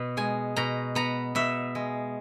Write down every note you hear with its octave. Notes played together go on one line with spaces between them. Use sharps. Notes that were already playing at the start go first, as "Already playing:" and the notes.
Already playing: B2 B3
G#3 G#5
B2 A#5
B3 A#5
B2 E5
G#3